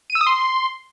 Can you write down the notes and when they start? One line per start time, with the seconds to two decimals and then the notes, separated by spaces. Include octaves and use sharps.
0.10 D#7
0.15 E6
0.21 D#6
0.27 C6